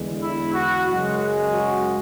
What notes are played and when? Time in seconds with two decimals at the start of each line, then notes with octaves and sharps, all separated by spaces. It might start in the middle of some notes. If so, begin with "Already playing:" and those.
Already playing: E2 D3 G#3
0.21 E4
0.52 F#4
0.87 F#2 C#3 G#3
1.52 F#4